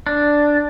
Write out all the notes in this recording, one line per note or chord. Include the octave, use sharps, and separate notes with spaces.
D4